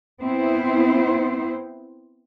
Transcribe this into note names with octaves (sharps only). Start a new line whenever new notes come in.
B3 C4 E4 C5